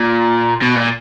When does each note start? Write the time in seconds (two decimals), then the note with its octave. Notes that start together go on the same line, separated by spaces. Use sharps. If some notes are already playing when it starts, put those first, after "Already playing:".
Already playing: A#2
0.62 B2
0.76 A#2